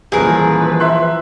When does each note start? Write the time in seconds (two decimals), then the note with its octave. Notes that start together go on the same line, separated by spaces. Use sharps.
0.12 D#1 E3 F3 G#4 A#4 B4
0.80 E5 C6 F#6